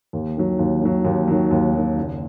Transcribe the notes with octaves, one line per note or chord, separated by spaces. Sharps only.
D#2
D#3 F#3
D#2
D#3 F#3
D#2
D#3 F#3
D#2
D#3 F#3
F#1